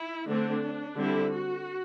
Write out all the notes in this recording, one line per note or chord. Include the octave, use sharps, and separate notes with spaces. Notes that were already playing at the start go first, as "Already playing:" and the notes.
Already playing: E4
D3 A3 C4 D4
D3 G3 C4 E4
F#4